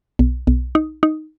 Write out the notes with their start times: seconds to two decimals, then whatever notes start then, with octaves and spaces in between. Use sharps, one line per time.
0.19 B1
0.47 B1
0.75 D#4
1.03 D#4